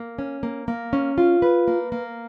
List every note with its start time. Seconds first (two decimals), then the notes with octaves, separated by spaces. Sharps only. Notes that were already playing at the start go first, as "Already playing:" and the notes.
Already playing: A#3
0.19 C#4
0.43 A#3
0.68 A#3
0.93 C#4
1.18 F4
1.42 B4
1.68 A#3
1.92 A#3